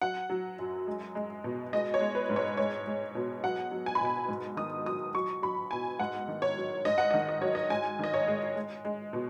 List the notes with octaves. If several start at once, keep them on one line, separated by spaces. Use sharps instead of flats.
F#3 F#5
F#3
F#2
G#3
G#3
B2
G#3 D#5
C#5
G#3
B4
G#2
C#5
G#3 C#5
G#3
B2
F#3 F#5
F#3
G#5
B5
B2 G#5
G#2
D#3 D#6
F#3 D#6
F#3 C#6
F#3 B5
B2 G#5
G#2 F#5
D#3
C#5
F#3
G#2 D#5
F#5
D#5
D#3
D#5
F#3 C#5
D#5
G#2 G#5
D#3 D#5
C#5
G#3
G#3
G#3
B2